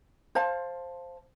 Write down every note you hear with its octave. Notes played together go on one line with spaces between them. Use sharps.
C5 F5 A5